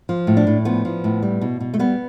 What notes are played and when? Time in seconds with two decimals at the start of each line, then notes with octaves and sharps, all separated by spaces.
0.09 F3
0.27 A2
0.37 D4
0.47 A2
0.65 F3 B3
0.85 F3
1.04 A2
1.23 G3
1.41 B2
1.60 B2
1.74 A3
1.79 G3 B3